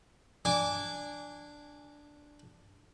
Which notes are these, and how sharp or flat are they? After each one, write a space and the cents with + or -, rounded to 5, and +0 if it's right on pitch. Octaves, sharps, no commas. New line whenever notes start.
D4 +0 G#5 -15 D6 -25